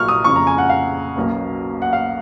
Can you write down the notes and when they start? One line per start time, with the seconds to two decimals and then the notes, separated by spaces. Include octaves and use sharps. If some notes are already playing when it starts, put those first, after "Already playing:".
Already playing: A#1 A#2 F#3 A#3 C#6 F6
0.08 D#6
0.24 F2 C#3 F3 C#6
0.36 A#5
0.47 G#5
0.58 F#5
0.70 F5
1.16 B1 B2 A#3 C#4
1.82 F#5
1.93 F5